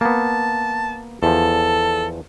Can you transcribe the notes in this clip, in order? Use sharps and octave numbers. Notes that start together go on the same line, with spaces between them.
A#3 B3 A5
E2 F3 A4